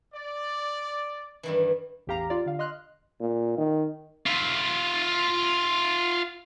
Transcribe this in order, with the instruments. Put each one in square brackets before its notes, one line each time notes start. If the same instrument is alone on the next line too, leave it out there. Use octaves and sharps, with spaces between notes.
[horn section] D5
[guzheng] G2 D#3 E3
[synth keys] A1 E2 G4 F5 A#5
F4 G4 D5
D3 F5
D#5 C6 F6 F#6
[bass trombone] A#2
D#3
[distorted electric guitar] F4 E5